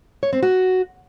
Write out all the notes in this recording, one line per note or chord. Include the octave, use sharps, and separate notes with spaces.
C#5
C4
F#4